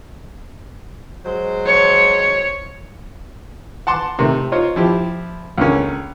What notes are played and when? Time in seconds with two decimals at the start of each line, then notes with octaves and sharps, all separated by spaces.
1.25 F#3 G#3 C5
1.66 C#5
3.87 F#5 A5 C6 D6
4.19 C3 D#3 A3
4.52 D#4 F4 C5 C#5
4.76 F3 E4 G4
5.58 C#2 D3 A#3 C#4